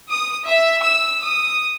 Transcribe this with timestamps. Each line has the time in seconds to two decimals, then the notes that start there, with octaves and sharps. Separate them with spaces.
0.10 D#6
0.46 E5
0.81 E6
1.22 D#6